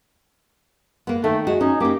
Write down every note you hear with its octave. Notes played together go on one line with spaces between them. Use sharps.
A#3 B3
D#3 A3
G#3 F#4
C#4 D#4
A#3 D#4 G4